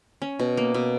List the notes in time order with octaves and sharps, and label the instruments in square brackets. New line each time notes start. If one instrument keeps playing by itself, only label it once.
[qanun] C#4
B2
A#3
B2